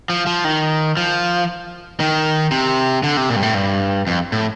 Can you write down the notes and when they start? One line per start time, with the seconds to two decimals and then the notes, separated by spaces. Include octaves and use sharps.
0.10 F3
0.27 F3
0.44 D#3
0.97 F3
2.00 D#3
2.51 C3
3.03 D3
3.17 C3
3.29 A#2
3.36 G2
3.42 A2
3.55 G2
4.07 F2
4.32 A2